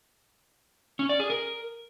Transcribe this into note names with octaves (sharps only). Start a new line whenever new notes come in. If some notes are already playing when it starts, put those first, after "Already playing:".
C#4
D5
G#4
A#4